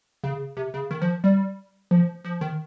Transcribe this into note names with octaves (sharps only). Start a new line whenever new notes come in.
C#3
C3
C#3
D#3
F3
G3
F3
F3
D#3